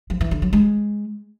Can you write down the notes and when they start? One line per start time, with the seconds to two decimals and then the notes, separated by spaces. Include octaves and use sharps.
0.10 F3
0.21 E3
0.31 D3
0.42 F#3
0.53 G#3